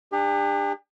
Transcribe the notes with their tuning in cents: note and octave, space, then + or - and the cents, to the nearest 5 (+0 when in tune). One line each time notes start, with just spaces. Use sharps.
D4 +20 G4 +40